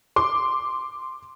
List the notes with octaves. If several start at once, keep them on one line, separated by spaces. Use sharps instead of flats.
C6 D6